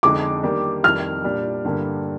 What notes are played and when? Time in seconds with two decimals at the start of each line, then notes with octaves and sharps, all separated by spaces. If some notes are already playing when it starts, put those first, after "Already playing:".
0.03 F2 D3 G#3 D#4 D6
0.43 D#3 G3 A#3 D4 G4
0.84 F2 D#3 G3 F6
1.24 A#2 G3 D4 G4
1.65 G2 D3 G3 A#3